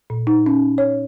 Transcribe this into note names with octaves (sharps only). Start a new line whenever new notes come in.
A#2
D#4
C#4
C#5